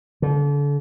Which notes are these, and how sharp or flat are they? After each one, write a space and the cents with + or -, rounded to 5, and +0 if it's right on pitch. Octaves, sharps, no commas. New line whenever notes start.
D3 -35